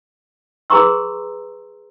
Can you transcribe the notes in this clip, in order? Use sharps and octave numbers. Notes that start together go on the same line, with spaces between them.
G#4 B4 A#5 C6 C#6 E6